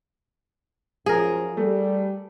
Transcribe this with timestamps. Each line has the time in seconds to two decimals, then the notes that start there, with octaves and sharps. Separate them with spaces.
1.06 F#2 F3 G#4 A#4
1.57 G3 A3